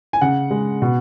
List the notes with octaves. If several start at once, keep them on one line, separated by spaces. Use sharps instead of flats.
G#5
C#3 F#5
G#3
B2